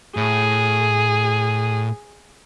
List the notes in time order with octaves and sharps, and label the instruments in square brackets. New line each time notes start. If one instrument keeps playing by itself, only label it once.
[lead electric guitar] A2 [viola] G#4